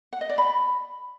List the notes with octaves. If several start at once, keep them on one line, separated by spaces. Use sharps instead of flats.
F#5
D#5
D5
B5